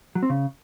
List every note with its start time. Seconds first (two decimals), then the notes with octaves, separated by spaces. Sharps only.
0.15 F#3
0.23 C4
0.30 C#3